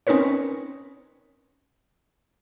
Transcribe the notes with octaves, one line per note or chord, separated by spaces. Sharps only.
C4 C#4 D#4 A#4 B4 C#5